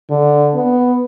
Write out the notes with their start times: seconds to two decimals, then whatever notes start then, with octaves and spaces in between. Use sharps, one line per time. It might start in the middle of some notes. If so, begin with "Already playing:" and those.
0.10 D3
0.55 B3